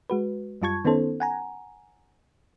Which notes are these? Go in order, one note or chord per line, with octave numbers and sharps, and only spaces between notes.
G#3 F#4 B4
F#2 G3 F4 A5 C#6 G#6
D#3 B3 C#4 D#4 A4 C5
F#5 G#5 A#5